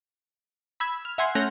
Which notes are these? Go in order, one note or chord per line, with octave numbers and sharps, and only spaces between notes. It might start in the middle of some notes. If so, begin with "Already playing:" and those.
B5 E6 G#6
F6
E5 F#5 G#5 C6 G#6
A3 C#4 F#5 F6 G6 A#6